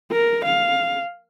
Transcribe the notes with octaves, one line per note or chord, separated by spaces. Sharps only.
A#4
F5